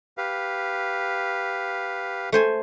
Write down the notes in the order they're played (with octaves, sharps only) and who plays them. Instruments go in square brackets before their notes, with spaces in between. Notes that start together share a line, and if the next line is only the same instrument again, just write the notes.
[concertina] G4 B4 F5
[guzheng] A3 C5 G#5